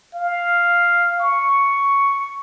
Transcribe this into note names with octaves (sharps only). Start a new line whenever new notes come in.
F5
C#6